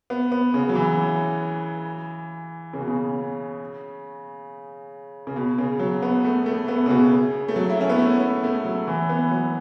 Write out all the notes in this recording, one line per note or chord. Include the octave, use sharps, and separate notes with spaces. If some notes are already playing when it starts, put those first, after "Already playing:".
B3
B3
C#3
F#3
E3
C#3
B2
C#3
C#3
B2
C#3
F#3
B3
A3
A3
B3
C#3
B2
C#3
A3
F#3
E4
C#4
B3
A3
B3
A3
F#3
E3
B3
F#3